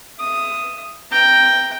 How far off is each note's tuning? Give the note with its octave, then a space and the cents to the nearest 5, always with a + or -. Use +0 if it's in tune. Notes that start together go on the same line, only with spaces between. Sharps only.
E5 +30 D#6 +0
G5 +0 A#5 +0